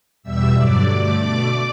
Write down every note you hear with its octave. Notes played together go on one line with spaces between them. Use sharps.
E2 B2 G3 E5 E6
G2 D3 F#3 D5 D6
G2 D3 A3
B2 A3 D5 D6